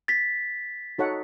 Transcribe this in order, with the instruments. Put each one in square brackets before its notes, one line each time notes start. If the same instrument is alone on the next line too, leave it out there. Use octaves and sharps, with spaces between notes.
[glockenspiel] A6 B6
[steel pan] D#4 F#4 A4 C#5 F#5